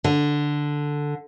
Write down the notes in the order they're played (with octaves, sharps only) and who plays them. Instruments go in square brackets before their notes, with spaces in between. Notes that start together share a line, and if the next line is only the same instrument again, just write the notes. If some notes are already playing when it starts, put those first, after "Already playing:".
[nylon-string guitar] D3